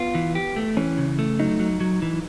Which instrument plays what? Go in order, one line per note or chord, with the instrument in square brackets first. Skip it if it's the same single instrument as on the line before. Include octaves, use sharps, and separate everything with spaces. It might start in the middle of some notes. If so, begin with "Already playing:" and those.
Already playing: [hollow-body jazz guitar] B3 [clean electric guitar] F4
[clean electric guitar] E3
G4
A3
[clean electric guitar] E3 [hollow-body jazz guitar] C#4
[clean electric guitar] C#3
A3
[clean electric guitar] F#3 [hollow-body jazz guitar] D#4
[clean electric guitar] F#3
F#3
E3